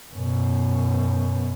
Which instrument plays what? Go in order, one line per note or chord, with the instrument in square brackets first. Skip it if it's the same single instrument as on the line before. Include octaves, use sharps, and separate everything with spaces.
[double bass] F#2 B2